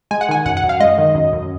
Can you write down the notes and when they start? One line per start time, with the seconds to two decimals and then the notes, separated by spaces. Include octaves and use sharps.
0.11 G#3 G#5
0.21 F#5
0.29 D#3 G#5
0.46 F#2 F#5
0.57 F#5
0.63 F#2
0.69 F5
0.80 G#3 D#5
0.98 D#3
1.15 F#2
1.33 F#2